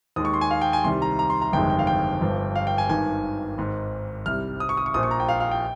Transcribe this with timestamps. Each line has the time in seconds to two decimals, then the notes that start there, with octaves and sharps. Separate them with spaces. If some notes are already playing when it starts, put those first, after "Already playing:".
0.16 D#2 D#3 G#3 D#6
0.25 C#6
0.34 C6
0.41 G#5
0.51 F5
0.62 G5
0.73 G#5
0.84 C2 C3 D#3 G3 C6
1.02 A#5
1.19 A#5
1.30 C6
1.42 A#5
1.53 G1 F2 C3 D#3 G#3 G5
1.70 G5
1.79 F5
1.87 G5
2.21 G1 G2 F3
2.56 F5
2.67 G5
2.78 G#5
2.89 G#1 G2 D#3 G#5
3.58 G#1 G#2 D#3
4.26 C2 C3 G3 F6
4.60 D#6
4.69 C#6
4.77 D#6
4.86 C#6
4.94 A#1 A#2 F3 D#6
5.03 C#6
5.11 A#5
5.20 G5
5.29 F5
5.40 F5
5.51 G5